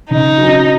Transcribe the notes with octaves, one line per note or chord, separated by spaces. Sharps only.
C#3 D#4
F#3
C#4